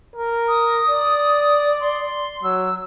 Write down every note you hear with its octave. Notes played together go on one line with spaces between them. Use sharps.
A#4
D#6
D5
C6
F#3 E6